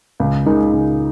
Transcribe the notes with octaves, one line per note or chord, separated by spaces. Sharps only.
C#2
C#3 G#3 D#4 A#4
C#2